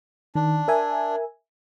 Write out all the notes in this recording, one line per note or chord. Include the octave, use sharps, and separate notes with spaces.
D#3 D4
A#4 E5 G#5